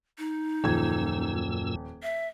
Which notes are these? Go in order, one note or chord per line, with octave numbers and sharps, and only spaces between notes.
D#4
D#1 F#2 A#2 F3 E6 G#6
E5